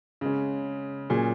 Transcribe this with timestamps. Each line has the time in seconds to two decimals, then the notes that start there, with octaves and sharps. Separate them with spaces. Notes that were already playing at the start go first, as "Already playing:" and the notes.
0.21 C#3 G#3 C#4
1.10 A#2 F#3 C#4 G#4